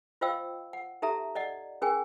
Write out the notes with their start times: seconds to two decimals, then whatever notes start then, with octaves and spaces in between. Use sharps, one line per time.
0.21 F4 C5 D#5 F5 G5 E6
0.73 F#5
1.02 D#4 G4 A4 E5 A#5
1.35 D5 D#5 F#5
1.82 C#4 G#4 A#4 G5 G#5